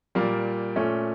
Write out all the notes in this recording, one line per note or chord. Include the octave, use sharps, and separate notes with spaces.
A#2 G3 A#3
A#2 A3 C#4